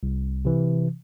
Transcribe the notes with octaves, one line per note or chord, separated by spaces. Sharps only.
C2
C3 E3